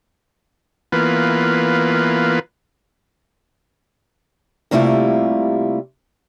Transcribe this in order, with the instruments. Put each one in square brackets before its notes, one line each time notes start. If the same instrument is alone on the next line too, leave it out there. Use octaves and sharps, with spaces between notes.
[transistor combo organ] E3 A#3 B3 F4 B4
[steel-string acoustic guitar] C3 G3 A3 A#3 E4 F4